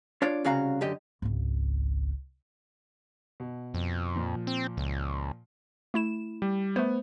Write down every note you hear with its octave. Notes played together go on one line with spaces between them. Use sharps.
D4 F4 C#5 D5
C2 C#3 C#4 F#4 F5 A#5
F#2 D3 G4 D#5
G#1 C#2
B2
F2
A#2 F3
C4
C#2
A3 E4 E7
G3
A3 B3 C5